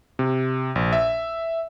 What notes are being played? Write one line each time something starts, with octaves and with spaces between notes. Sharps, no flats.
C3
A#1
E5